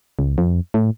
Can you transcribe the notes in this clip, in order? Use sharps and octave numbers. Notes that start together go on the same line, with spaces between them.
C#2
F2
A2